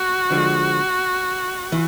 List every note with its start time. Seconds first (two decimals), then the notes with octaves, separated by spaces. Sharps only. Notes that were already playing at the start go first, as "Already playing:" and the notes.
Already playing: F#4
0.30 D3 F3 G#3
1.72 E3